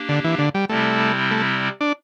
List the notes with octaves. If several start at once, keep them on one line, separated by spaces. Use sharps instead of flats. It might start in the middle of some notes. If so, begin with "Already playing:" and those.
Already playing: A#3 D4 G4
D3
E3
D3
G3
C3 G3 A3 C4 E4
A3
D4